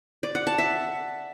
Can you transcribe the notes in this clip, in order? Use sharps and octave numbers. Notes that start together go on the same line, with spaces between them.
D5
F#5
A5
E5